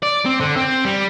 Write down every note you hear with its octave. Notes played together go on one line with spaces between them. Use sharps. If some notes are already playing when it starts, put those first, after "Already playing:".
D5
C4
D3
C4
G3